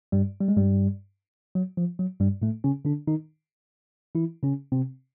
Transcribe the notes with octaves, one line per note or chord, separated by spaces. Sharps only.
G2 G3
G3
G#3
G2 G3
F#3
F3
F#3
G2 G3
A2 A3
C#3 C#4
D3 D4
D#3 D#4
E3 E4
C#3 C#4
C3 C4